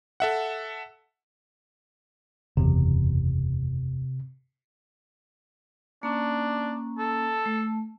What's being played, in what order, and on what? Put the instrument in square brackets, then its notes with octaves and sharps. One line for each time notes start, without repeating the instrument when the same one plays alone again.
[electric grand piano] A4 E5 F#5
[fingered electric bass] F#1 E2 [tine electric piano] C3
[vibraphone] A#3 C#4 [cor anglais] D4
[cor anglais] A4
[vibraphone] A3